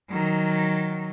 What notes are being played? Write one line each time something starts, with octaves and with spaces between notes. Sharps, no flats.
D#3 F#3